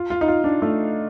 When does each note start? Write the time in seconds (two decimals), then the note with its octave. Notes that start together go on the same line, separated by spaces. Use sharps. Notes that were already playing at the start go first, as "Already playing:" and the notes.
Already playing: F4
0.10 F4
0.21 D#4
0.28 F4
0.44 D4
0.62 A3